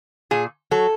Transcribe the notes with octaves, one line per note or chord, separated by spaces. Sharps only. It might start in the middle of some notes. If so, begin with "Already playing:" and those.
A#2 G#4
F#3 A4